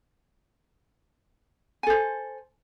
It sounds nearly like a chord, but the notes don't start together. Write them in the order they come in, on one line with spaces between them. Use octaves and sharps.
G#5 A4 C5